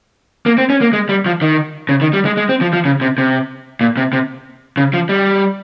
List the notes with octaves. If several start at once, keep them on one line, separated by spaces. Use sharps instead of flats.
A#3
C4
C#4
A#3
G#3
G3
F3
D#3
C#3
D#3
G3
G#3
G#3
C4
F3
F3
C#3
C3
C3
A#2
C3
C3
C#3
F3
G3